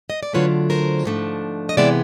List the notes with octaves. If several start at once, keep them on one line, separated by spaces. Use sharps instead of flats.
D#5
D5
D3 F#3 A3 D4 F4 B4 C#5
A#4 C5
G#2 F3 A3 D4
D#5
C3 E3 G#3 B3 D5 E5